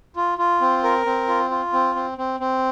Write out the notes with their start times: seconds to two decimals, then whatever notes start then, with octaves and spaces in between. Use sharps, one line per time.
0.16 F4
0.38 F4
0.61 C4
0.84 A#4
1.06 C4
1.28 F4
1.50 F4
1.73 C4
1.95 C4
2.18 C4
2.40 C4